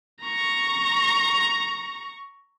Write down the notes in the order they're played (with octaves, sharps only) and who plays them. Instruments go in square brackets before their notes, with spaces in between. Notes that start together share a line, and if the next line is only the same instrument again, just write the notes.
[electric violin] A#5 C#6